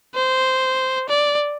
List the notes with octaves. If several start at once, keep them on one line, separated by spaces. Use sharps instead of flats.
C5
D5